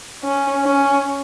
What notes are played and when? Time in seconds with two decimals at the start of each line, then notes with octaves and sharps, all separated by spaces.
0.24 C#4
0.65 C#4